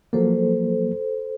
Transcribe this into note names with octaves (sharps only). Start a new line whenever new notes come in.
F3 F#3 A#3 A4 C5